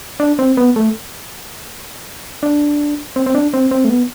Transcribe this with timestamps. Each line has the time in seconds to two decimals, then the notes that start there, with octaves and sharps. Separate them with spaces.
0.20 D4
0.39 C4
0.57 B3
0.76 A3
2.43 D4
3.16 C4
3.26 C4
3.35 D4
3.54 C4
3.71 C4
3.84 A3
3.90 B3